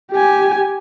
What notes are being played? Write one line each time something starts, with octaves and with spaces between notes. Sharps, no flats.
G4 G#5